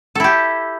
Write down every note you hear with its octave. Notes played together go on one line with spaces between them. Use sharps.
E4 G4 A4